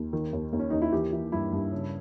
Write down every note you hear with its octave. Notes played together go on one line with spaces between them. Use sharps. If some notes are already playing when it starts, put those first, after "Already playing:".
Already playing: D#2
D#3
D#2
D#2
C#4
D#2 D#4
E4
E3 G4
E3
G2 E4
G2
C#3